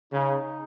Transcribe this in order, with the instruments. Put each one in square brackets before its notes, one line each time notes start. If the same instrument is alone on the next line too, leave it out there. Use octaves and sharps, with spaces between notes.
[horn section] C#3 [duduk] D#4